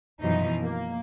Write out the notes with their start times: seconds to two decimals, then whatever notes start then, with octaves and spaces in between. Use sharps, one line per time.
0.20 F#2 B2 E3 F3 D#4
0.61 A#3